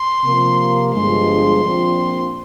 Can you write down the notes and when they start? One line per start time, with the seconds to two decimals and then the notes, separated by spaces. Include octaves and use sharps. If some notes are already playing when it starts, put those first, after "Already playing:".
Already playing: C6
0.24 C3 F3 A#3
0.94 G1 G2 F3 G#3 C6
1.63 A#1 A#2 F3 C4